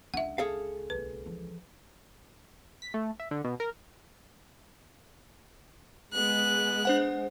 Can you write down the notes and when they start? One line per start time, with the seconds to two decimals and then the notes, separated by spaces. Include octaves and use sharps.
0.14 C#2 D4 E5 F#5
0.38 G#4 A4 F5
0.90 B1 A#3 B4
1.25 E3 F3
2.82 B6
2.94 A3
3.20 E5
3.31 D3
3.44 B2
3.60 A#4
6.13 G#3 B3 F#6
6.85 D4 C5 F#5